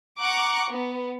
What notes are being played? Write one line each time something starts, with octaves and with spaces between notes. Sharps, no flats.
F#5 A#5 C#6 D6 F#6
B3